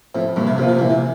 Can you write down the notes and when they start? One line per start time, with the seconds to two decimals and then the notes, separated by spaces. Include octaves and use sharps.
0.14 A2 F3 C4 F4
0.36 G2 A#2
0.47 C3
0.58 A#2 F3 C4 F4
0.69 C3
0.79 A#2 E3
0.90 C3